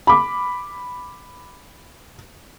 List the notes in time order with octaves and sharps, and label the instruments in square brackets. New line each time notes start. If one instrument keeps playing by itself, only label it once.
[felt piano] B5 D6